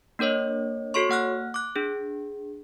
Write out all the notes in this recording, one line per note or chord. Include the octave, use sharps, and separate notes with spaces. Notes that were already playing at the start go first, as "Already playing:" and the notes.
A#3 D4 A#4 C#5 D#5
F#4 A4 C#5 C6 C#6
A#3 F#5 F6 F#6
D6 F#6
D4 G#4